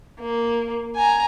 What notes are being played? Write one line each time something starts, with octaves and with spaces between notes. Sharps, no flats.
A#3
G#5 A#5